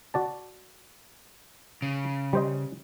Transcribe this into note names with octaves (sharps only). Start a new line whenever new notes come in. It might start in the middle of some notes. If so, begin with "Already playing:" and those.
F#4 D5 A5
C#3
G3 C5 D#5